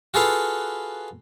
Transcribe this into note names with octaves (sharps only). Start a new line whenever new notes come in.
F4 F#4 G#4 A4 B4 F5